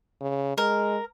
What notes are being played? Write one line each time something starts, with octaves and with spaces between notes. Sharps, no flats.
C#3
G#3 A#4